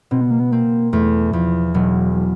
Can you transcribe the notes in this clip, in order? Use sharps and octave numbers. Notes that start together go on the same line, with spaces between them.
B2 C4
B3
A#3
B3
A#3 C4
E2 A3
E2 F3
E1 F#3
F#3